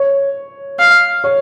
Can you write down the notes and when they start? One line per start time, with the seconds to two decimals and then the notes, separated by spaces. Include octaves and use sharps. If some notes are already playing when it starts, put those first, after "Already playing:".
Already playing: C#5
0.79 F5
1.24 C#5